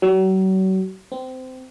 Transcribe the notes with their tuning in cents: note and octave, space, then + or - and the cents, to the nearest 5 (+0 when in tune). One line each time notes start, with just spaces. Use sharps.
F#3 +40
C4 -20